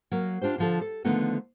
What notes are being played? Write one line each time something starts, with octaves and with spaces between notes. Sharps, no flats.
F#3 A#3 A#4
D4 F4 G4 C5
D3 F3 A4
A4
D3 D#3 F3 A3 B3 D#4